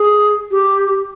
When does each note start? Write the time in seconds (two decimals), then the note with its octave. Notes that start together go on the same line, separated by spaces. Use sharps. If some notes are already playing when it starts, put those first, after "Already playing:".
Already playing: G#4
0.51 G4